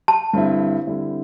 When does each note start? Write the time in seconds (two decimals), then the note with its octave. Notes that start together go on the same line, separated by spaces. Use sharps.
0.08 A5
0.33 G2 D3 C4 E4
0.87 D3 G3 C4 E4